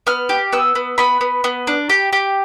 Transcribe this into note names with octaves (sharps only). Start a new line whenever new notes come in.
B3 F6
G4
B3 E6
B3
B3 B5
B3
B3
D4
G4
G4